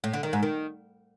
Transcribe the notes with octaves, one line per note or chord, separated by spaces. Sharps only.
A2
D3
D#3
G#2
D#3